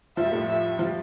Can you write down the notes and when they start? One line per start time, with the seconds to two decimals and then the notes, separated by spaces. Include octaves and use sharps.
0.17 F2 F3 E5
0.25 G3
0.32 A2 A3
0.48 E5
0.79 F3
0.87 G3